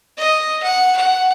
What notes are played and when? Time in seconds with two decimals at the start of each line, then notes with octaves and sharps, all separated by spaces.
0.18 D#5
0.63 F#5
0.97 F#5